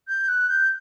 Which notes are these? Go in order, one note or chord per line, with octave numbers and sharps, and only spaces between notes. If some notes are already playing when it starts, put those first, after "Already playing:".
G6
F#6
G6